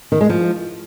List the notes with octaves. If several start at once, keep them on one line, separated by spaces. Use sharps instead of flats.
D#3
G#3
F3